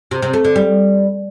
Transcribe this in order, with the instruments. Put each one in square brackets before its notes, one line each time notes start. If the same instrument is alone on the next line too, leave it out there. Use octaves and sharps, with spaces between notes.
[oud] C3
C3
A3
D3
G3